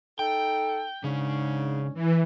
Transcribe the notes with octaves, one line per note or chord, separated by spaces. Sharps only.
D#4 A4 G5
G#2 C#3 C#4 D4
E3